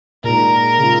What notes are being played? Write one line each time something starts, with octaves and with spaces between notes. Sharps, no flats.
A#2 G#3 D#4 A#4
C#3 G#3 C#4 F4